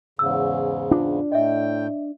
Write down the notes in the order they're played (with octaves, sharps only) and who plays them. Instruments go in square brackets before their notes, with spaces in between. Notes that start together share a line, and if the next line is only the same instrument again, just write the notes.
[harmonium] E2 G#2 C#3 [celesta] E6
[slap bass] D4 [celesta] F4
[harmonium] A2 G5 [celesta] D#5 E5